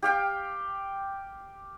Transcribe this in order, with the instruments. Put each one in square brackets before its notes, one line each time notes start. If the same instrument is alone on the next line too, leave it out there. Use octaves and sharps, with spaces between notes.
[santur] G4 F5 G5